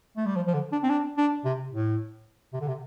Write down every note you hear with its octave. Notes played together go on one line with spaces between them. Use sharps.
A3
G3
F3
F3
D3
D4
C4
D4
D4
C3
A2
C3
D3
C3